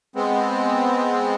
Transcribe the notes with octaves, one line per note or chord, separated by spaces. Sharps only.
G#3 B3 C4